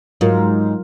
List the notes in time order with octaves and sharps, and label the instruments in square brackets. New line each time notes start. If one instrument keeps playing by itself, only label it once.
[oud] G#2 [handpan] F#3 F4 A#4